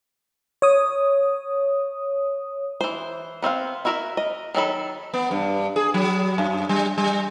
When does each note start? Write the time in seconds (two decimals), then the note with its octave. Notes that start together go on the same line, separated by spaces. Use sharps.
0.62 C#5 D#6
2.81 E3 C5
3.42 B3 C4 E5 F5
3.85 E4 F#4 A#4 C#5 E5
4.17 D#5
4.55 D#3 F#3 A4 B5
5.14 B3
5.31 G2
5.76 G#4
5.94 F#3
6.38 F#2
6.69 G3
6.98 G3